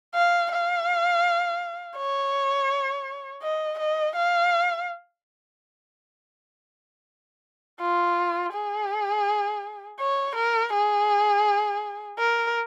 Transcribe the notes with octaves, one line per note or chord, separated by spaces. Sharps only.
F5
F5
C#5
D#5
D#5
F5
F4
G#4
C#5
A#4
G#4
A#4